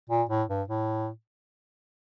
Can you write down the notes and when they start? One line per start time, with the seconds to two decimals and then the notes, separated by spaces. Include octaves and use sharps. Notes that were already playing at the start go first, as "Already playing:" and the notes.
0.09 A#2
0.29 A2
0.49 G2
0.68 A2